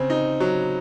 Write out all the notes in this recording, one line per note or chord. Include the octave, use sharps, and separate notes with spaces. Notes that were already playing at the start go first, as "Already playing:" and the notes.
Already playing: C#3 C4
D#4
F#3